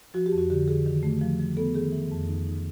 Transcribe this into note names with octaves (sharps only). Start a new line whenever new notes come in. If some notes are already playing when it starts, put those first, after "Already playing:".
F3 F#4
G4
F2
F#4
D3 G4
D3 G#4
D#3
A3
F3
F3
B3 A4
D#3 G#4
E3
F2
D#4
D#4